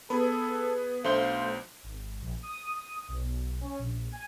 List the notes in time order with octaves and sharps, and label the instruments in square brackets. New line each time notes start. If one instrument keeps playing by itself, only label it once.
[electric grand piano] B3 G#4 [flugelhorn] A4 [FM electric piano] B4
[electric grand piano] B1 D4 C6 [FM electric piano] A3 C5 G6 [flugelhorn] F5
[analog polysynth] G#1
A#1
D#6
B1
C#4
A#1
G#5